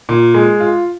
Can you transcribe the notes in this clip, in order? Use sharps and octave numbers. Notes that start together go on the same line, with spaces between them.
A#2
G#3
F4